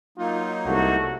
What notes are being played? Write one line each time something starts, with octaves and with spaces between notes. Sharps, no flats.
F#3 A#3 D#4 F4
C2 A3 F#4